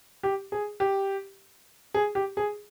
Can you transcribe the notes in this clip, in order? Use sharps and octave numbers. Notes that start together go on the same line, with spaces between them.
G4
G#4
G4
G#4
G4
G#4